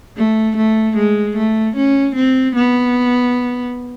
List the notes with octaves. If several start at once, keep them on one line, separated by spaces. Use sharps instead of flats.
A3
A3
G#3
A3
C#4
C4
B3